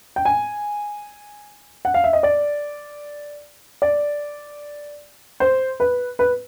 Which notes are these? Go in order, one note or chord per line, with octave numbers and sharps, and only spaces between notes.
G5
G#5
F#5
F5
E5
D#5
D5
D5
C5
B4
B4